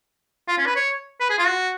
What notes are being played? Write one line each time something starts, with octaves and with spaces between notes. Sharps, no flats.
F4
C#4
B4
C#5
B4
G#4
F4
F#4